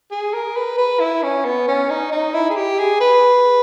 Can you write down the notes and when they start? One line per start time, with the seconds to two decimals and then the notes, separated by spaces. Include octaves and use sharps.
0.11 G#4
0.34 A#4
0.56 B4
0.78 B4
1.00 E4
1.23 C#4
1.45 B3
1.68 C#4
1.90 D#4
2.12 D#4
2.34 E4
2.50 G#4
2.56 G4
2.79 G#4
3.01 B4